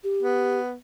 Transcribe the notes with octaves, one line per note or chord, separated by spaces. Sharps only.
G4
B3